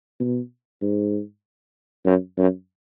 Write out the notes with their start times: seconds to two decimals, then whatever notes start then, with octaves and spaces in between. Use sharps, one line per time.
0.20 B2
0.82 G#2
2.06 F#2
2.38 F#2